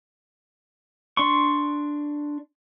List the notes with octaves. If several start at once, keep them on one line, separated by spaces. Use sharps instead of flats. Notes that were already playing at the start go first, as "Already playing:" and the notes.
D4 C6 C#6